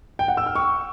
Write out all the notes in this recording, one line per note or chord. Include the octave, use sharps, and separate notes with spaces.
G5
F#5
E6
F6
C#6